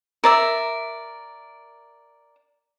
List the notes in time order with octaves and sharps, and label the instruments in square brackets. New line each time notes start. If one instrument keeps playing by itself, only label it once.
[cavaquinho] A#4 D5 E5